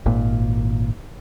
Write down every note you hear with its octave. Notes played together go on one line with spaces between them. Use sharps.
G#1 A#2